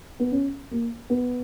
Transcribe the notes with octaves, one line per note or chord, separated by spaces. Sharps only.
B3
C#4
A#3
B3